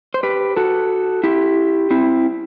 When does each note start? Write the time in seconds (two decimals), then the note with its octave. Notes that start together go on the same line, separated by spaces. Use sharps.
0.14 C5
0.23 G4 B4
0.57 F#4 A4
1.24 E4 G4
1.91 C4 E4